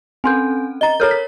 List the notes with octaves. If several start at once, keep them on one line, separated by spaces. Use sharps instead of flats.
C4 C#4 A4 G#5 C6 G6
D#5 A#5 A6 G7
A4 A#4 C#5 A#5 F6 G6
B6